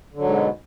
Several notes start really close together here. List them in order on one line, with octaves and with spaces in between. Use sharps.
D3 F#3 G#2 B2